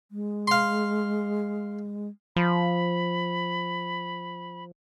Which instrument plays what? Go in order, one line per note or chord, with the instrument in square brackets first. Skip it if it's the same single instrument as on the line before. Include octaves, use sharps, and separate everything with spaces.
[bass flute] G#3
[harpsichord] F5 C6
[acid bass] F3 [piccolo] B5